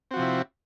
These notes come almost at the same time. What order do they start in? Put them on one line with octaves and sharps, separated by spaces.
C4 F#4 F3 C3 E4